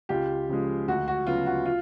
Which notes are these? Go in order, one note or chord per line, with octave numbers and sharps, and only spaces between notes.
C#2 F4 G4
C#3 F3 G#3
D2 F#4
F#4
C#3 F#3 B3 F4
F#4
F4